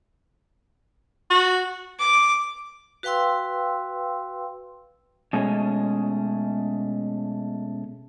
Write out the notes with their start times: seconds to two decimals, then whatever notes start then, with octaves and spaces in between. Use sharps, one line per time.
1.30 F#4
1.99 D6
3.03 F#4 B4 F5 G5 C6 E6
5.33 B2 G#3 A3 C#4